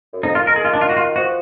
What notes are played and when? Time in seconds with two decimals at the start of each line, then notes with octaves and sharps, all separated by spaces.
0.13 F#2
0.23 F2 D#4
0.35 D#3 F4
0.47 A#4
0.56 G#4
0.65 F4
0.73 D4
0.81 F4
0.89 F#4
0.97 F4
1.16 F3 F#4